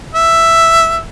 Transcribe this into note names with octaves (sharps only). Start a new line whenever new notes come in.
E5